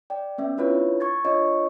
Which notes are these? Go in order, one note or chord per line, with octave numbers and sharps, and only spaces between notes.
D5 G5
B3 C#4 E5
D4 E4 F4 B4 C#5
C#6 G#6 A6
D4 F4 C#5 D#5 C#6